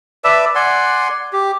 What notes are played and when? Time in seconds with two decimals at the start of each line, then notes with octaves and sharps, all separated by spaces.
0.24 B4 D5 E5 A5
0.55 D5 F#5 G#5 C6
1.33 G4